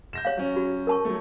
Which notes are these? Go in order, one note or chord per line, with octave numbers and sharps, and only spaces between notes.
G6 A#6 E7
C#5 F5
F#3 C#4
F#4
A#4 A5 C#6
F#3 A3